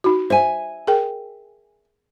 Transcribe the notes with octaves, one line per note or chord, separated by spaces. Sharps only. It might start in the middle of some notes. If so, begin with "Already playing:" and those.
D#4 F#4
C5 E5 G#5
G#4 A#4 G5